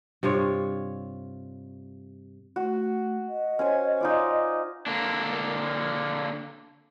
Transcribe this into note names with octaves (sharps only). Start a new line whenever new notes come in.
G2 C3 F4 C#5
A3 F#4
D#5
C#4 C5 G#5
D#4 F4 D5
D3 A#3 D4